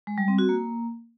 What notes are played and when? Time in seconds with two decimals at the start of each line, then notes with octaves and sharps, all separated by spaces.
0.07 G#3
0.18 G3
0.28 C4
0.38 F#4
0.49 A#3